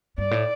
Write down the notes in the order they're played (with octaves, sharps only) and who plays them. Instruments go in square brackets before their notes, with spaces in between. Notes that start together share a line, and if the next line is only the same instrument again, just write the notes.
[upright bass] G2 [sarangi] D5
[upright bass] A2